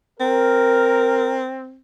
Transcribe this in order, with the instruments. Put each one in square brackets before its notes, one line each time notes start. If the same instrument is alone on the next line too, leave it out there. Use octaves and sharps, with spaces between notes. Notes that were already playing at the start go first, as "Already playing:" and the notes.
[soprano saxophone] C4 [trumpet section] A#4